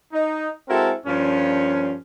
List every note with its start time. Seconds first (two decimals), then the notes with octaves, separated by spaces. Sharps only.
0.12 D#4
0.68 G#3 C4 E4 F#4 A4 A#4
1.05 G2 A#2 F3 C#4